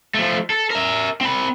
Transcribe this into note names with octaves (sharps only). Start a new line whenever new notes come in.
F3 A3
A4
A#4 E5
C4 B5